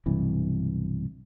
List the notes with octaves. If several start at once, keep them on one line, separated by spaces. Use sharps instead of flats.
B1 G2 C3 E3